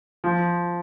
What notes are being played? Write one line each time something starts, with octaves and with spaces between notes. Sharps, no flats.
F3